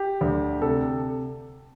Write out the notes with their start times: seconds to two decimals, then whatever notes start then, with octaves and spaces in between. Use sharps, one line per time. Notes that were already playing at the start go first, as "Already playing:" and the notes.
Already playing: G4
0.21 D2
0.62 C3 A4